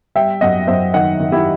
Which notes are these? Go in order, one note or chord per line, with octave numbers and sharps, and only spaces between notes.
G3 E5 G5
F#2 D#5 F#5
F#2 C5 E5
D#3 D#5 F#5
D#3
E4 G4